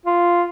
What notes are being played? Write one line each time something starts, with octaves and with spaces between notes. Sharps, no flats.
F4